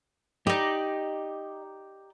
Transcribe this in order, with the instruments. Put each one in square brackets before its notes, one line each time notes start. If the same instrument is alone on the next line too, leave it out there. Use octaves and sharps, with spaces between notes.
[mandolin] D#4 D5 [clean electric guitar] G4 [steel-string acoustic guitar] D#5